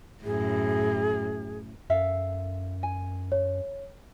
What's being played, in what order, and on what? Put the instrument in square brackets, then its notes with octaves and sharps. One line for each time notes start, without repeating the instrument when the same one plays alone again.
[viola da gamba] F#2 A2 [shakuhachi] G#4
[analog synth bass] F#2 [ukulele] A4 E5 F5
[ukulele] G#5
[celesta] C#5